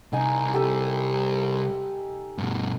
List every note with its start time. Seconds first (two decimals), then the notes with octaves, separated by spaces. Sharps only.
0.13 C2 D#4 G#5 A#5
0.54 G4 A4 G#5
2.38 G2 B2